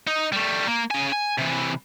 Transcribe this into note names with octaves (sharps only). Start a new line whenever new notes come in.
D#4
G3 A3
A#3
C#3 G#5
G#5
C3 E3